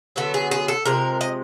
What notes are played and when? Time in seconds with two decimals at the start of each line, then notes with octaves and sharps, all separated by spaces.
0.16 D3 F#3 B3 A4
0.34 G#4
0.51 G#4
0.68 A4
0.85 C3 F3 G#3 A#4
1.21 D#5